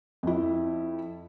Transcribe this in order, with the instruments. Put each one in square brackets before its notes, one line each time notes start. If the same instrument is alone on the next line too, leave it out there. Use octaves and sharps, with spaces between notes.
[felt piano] F2 E4